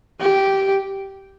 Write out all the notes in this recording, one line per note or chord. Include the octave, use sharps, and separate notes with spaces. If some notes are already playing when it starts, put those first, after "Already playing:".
G4